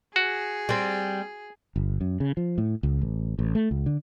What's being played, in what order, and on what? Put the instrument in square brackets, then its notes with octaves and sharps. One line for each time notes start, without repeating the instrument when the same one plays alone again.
[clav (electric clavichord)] F#4 [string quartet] G#4
[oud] G3 C4
[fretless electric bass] G1
F#2
C#3
F3
A2
C#2
A1
A1
A3
C#2
D3